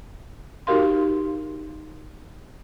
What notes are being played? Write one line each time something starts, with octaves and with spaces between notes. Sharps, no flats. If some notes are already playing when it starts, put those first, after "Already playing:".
D#4 F#4 G4 A#4 F5 C6